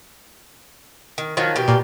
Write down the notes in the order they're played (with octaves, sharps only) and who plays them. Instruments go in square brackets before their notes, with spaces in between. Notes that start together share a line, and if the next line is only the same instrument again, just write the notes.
[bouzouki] D#3
D#3 F3 F#3
B2 G4
[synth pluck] A#2